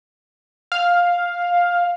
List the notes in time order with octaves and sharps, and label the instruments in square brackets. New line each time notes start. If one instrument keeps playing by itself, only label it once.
[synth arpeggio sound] F5